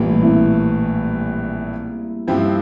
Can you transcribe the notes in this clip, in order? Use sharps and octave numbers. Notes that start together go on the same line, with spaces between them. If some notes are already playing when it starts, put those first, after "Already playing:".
Already playing: A#1 A2 E3 F3 G3 A3 A#3
C4 E4
G2 F3 C4 E4 G4